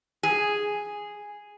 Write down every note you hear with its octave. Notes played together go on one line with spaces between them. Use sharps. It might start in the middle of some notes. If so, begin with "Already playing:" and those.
G#4